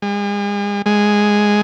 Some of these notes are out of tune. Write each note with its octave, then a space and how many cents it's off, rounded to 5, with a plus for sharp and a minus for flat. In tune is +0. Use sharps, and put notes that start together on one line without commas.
G#3 -40
G#3 -5